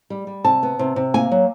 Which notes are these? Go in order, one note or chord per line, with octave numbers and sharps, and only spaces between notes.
G3
G3
C3 A5
B3
C3
C3
A#3 G#5
F#3